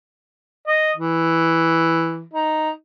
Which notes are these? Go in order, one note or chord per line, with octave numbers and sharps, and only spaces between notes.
D#5
E3
D#4